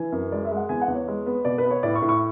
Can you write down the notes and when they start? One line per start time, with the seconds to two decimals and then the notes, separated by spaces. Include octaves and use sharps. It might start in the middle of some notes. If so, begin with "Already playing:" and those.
Already playing: E3 G#5
0.12 F#2
0.32 G#3 D5
0.45 E5
0.51 G#3
0.56 F#5
0.69 E2 G#5
0.82 F#5
0.88 E2
0.95 C#5
1.08 G#3
1.26 B3
1.45 B2 D5
1.58 B4
1.65 B3
1.71 C#5
1.83 A2 D5
1.95 C#6
2.02 A2
2.09 C#6